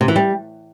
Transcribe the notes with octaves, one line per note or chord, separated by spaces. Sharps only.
C3
E3
G3